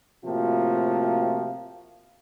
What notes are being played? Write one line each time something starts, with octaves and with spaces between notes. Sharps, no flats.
A2 C3 F3 A#3 F4 F#4